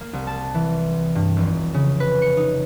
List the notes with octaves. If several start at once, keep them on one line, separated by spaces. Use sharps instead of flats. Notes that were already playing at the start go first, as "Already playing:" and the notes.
A#3
C2
A5
E3
G2
F1
C#3
B4
C#7
D#4